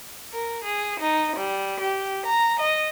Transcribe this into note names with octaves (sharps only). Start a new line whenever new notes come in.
A#4
G#4
D#4
G3
G4
A#5
D#5